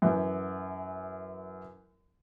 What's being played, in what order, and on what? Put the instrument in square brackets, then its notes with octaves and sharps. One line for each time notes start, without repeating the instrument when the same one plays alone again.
[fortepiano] F#2 E3